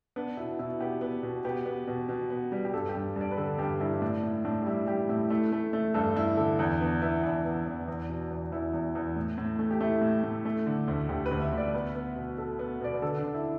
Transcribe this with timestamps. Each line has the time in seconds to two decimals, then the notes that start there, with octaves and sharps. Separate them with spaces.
0.16 B3 D4
0.37 B2 E4
0.59 B2 E4
0.80 B3 G4
1.01 B3
1.23 B2
1.45 B3 G4
1.66 B3
1.87 B2
2.09 B2
2.30 B3
2.52 G3
2.65 G4
2.73 G2 A4
2.89 G4
2.95 G2
3.16 G2 D5
3.31 B4
3.37 D3 A4
3.58 G2 G4
3.80 G2 E4
3.93 E4
4.02 A2 D4
4.23 A2 E4
4.45 A2 D4
4.61 G4
4.66 G3 E4
4.87 G3 G4
5.09 A2 E4
5.30 A3 E4
5.52 A3
5.73 A3
5.94 G2 A4
6.16 G2 E4
6.37 D3 A4
6.59 E2
6.81 B3 D4
7.02 B3 E4
7.23 E2 D4
7.45 B3
7.66 E2
7.88 E2
8.09 B2
8.31 E2
8.52 E2 E4
8.74 E2
8.95 E2
9.16 A2
9.38 A2
9.59 A3
9.71 G4
9.81 A3 E4
10.02 A2
10.24 A2
10.45 A3
10.66 D3
10.88 D2
11.09 D2 G4
11.26 B4
11.31 D2
11.41 E5
11.53 D2 D5
11.74 B3 B4
11.95 B3
12.16 B2
12.38 B2 A4
12.59 B3
12.81 B2 D5
12.93 B4
13.02 D3 A4
13.18 D4
13.23 D3
13.34 E4